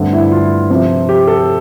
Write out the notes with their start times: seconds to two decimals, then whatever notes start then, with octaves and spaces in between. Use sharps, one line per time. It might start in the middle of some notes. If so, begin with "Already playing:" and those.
Already playing: G2 D3 A3 C4
0.13 E4
0.32 F4
0.70 C3 F3 C4
1.09 G4
1.27 A4